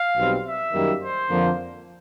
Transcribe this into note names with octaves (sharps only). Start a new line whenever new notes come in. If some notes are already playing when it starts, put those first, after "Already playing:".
Already playing: F5
B1 B2 G3 C4
E5
F#2 D#3 G3 A#3
C5
F2 D3 F3 A#3